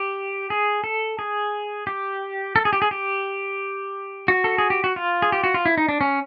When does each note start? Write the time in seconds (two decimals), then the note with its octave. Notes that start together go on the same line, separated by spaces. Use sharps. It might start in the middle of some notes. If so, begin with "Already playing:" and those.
Already playing: G4
0.50 G#4
0.84 A4
1.19 G#4
1.87 G4
2.56 A4
2.65 G#4
2.73 G4
2.82 G#4
2.91 G4
4.28 F#4
4.44 A4
4.58 G#4
4.70 G4
4.84 F#4
4.96 F4
5.22 G#4
5.32 G4
5.44 F#4
5.54 F4
5.66 E4
5.77 D#4
5.89 D4
6.01 C#4